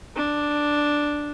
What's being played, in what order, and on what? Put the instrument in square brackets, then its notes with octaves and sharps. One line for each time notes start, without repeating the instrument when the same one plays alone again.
[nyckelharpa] D4